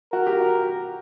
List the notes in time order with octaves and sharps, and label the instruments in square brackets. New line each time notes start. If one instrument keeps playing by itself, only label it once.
[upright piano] F#4 [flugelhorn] A#4
[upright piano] G4
F#4